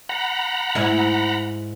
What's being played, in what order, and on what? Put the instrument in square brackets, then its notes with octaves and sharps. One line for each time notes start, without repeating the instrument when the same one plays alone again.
[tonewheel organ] F#5 A#5 B5
[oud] G#2 E4